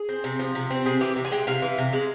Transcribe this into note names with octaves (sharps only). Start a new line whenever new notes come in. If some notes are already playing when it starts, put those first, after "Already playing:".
Already playing: G#4
C4
C3
F3
C3
C4
C3 G#4
E3 G4
C3
G#5
G#3 G5
C3 F5
E3
C3
G#3